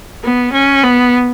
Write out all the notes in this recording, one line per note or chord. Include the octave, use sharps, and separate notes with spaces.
B3
C#4
B3